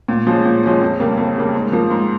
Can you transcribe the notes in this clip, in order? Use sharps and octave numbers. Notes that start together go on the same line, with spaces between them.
A#2
F3 G#3 C#4
A#2
F3 G#3 C#4
F2
C#3 G3 A#3
F2
C#3 G3 A#3
G#2
F3 A#3
G#2